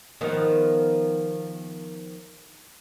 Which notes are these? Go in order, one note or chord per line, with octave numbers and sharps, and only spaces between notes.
D#3 F3 B3